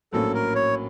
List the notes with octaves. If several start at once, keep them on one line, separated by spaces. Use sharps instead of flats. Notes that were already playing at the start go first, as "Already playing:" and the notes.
A#1 A2 F#3 A#3 C#4 A4
A#4
C#5